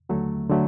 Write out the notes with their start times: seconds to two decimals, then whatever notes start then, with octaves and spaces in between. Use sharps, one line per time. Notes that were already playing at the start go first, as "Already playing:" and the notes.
0.09 D#2 D3 F#3 A3
0.50 D3 F#3 A3